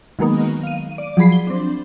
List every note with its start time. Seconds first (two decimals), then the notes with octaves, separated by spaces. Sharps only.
0.19 D#3 F#3 G#3 A#3 B3 D#4
0.63 F5 D#7
0.98 D5
1.17 F3 F#3 G#4 B5 C7
1.32 G7
1.47 C4 D4